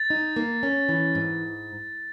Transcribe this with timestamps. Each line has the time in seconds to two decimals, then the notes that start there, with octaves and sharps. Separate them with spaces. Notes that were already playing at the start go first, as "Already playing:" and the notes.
Already playing: A6
0.10 D#4
0.36 A#3
0.63 C#4
0.89 E3
1.15 G#2